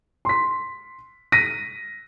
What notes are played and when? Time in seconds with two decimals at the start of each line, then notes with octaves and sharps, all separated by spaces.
0.25 C6 B6
1.32 A#6 B6 D#7